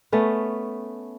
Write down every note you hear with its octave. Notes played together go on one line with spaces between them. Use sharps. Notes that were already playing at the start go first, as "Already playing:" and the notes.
A3 B3 C#4